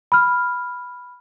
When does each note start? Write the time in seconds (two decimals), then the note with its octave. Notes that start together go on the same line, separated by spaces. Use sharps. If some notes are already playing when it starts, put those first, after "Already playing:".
0.12 B5 F6